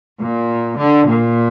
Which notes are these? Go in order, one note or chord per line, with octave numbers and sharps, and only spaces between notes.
A#2
D3
A#2